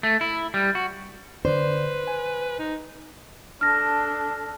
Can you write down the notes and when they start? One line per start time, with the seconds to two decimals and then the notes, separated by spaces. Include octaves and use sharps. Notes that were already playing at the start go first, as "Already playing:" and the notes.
0.03 A3
0.21 E4
0.54 G3
0.75 F#4
1.45 D3 B4 C5 D5
2.07 G#5
2.59 D#4
3.61 D4 A4 F6 A#6